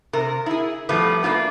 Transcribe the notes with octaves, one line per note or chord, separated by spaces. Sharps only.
C3 A#4
E4 G#4
F3 G3 A3 B3 B4
A#3 D4 F4 B4